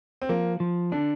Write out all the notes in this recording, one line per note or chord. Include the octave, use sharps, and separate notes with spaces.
C4
F3 A#3
F3
D3 D4